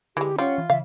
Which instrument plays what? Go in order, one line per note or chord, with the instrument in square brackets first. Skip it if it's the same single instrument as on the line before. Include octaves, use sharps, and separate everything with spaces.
[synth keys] D3 [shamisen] E3 G#3 [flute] G4
[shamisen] G3 [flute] C#4 [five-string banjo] F4 [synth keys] C#5 F#5
[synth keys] E3
[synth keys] C#3 E3 [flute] E5 [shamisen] F5